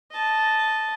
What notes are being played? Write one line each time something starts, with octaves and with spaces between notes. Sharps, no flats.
D#5 A5